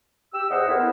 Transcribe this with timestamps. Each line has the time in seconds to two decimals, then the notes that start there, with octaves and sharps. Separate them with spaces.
0.33 G4 E6
0.50 E2 C5 D#5 F#5
0.67 C4 E4 A4 A#4 C5
0.79 B3